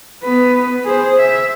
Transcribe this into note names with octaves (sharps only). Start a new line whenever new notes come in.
B3 B4
G#4 C5
E5